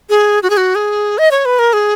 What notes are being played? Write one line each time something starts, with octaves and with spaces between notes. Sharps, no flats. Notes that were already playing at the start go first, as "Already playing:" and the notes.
G#4
F#4
G#4
F#4
G#4
D#5
C#5
B4
A#4
G#4